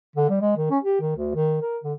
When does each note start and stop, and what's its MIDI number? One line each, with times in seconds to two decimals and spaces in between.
0.16 0.28 50
0.29 0.38 55
0.41 0.55 56
0.57 0.70 51
0.71 0.78 61
0.83 1.00 67
1.00 1.12 51
1.16 1.32 38
1.35 1.61 51
1.62 1.78 70
1.83 1.94 50